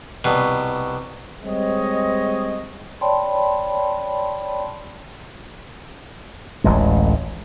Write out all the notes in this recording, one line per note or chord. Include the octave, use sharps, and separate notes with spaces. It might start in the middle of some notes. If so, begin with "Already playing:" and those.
C2 B2
G3 G#3 C4 C#5 D#5
C#5 D5 G5 A5 B5 C6
D1 A1 A2 G#3